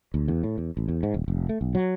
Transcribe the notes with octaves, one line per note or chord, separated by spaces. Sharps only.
D2
E2
A2
E2
A1
E2
G#2
D#1
F1
A3
B1
F#3